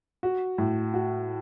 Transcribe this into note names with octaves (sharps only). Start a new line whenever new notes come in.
F#4
A2
F#4